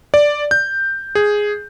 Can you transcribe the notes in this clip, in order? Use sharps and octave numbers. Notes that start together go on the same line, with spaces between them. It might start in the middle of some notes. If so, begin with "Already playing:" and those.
D5
G6
G#4